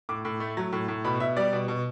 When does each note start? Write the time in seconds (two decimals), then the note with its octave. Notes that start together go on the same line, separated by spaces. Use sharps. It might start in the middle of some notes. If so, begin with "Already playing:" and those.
0.09 A2 D6
0.25 A2
0.40 A3
0.57 F#3
0.73 A2
0.88 A2
1.04 B2 B5
1.20 B2 E5
1.37 G3 D5
1.53 B2
1.68 B2